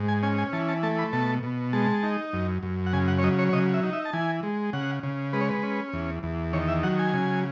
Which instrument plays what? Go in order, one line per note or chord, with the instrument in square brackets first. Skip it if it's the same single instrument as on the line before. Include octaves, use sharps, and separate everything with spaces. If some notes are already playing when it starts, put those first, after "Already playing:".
Already playing: [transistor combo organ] G#2
G#5
C#4 G#5
G#5
E3 A5
A5
A3 A5
B5
B2 A5
B2
G#3 A5
D#4
F#2
F#2
F#5
C#3 G#5
F#5
C#5
F#3 D#5
C#5
C#5
C#3 D#5
E5
D#4
E5
A5
E3 G#5
G#3
C#3 F#5
C#3
G#3 B4
C#5
B4
C#4
E2
E2
D#3 C#5
E5
F#3 F#5
G#5
C#3